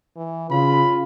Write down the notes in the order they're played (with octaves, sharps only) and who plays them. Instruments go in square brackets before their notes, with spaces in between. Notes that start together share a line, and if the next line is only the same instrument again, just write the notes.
[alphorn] E3
[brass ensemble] C#3 [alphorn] F4 [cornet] B5